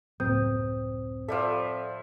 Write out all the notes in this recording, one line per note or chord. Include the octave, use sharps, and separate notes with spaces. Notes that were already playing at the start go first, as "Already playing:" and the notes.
C#2 F#2 A2 C4 D#6 G6
F3 G3 A4 D5 E5